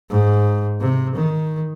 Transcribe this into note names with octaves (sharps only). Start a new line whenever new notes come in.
G#2
C3
D#3